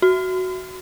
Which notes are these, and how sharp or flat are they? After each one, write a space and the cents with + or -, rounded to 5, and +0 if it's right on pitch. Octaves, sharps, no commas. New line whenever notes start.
F#4 +5